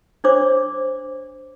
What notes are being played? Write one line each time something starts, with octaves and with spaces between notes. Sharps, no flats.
D4 C5 C#5 D6